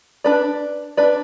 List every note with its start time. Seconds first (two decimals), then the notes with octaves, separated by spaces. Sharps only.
0.24 D4 B4 D5
0.97 D4 B4 D5